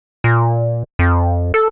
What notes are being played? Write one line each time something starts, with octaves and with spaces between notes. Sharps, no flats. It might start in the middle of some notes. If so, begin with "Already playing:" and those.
A#2
F2
A4